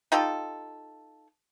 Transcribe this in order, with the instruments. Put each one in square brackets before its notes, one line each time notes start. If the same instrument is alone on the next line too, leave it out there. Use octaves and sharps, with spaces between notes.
[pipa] D#4 F4 G4 A4